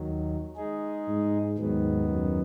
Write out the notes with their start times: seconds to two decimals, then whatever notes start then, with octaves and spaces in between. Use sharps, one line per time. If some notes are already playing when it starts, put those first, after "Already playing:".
Already playing: D#2 D#3 F#3
0.56 G#3 D#4 G#4
1.08 G#2
1.58 D#2 G#2 D#3 F#3 B3
2.09 F#2